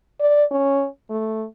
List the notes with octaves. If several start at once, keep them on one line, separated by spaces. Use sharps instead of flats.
D5
C#4
A3